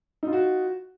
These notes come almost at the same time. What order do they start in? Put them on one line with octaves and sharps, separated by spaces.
D#4 F4 F#4